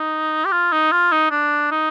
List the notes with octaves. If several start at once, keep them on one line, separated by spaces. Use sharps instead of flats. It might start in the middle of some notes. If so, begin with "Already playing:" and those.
Already playing: D#4
G4
F4
D#4
F4
D#4
D4
D#4